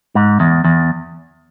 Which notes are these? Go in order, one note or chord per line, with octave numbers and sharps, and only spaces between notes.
G#2
E2
E2